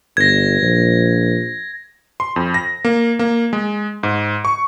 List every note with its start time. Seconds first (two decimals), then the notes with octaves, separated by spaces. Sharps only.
0.17 G1 G#6 A#6
0.62 A#1
2.20 C6
2.36 F2
2.54 A#6
2.85 A#3
3.19 A#3
3.53 G#3
4.03 G#2
4.45 C#6